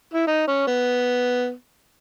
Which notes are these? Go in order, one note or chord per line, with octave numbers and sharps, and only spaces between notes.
E4
D#4
C#4
B3